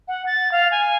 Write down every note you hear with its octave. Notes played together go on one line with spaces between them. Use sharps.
F#5
A6
F5
G#5